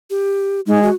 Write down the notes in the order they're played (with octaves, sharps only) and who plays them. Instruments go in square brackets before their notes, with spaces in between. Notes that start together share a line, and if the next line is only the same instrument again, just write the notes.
[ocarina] G4
[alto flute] G#3 [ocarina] D#4
[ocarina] F#4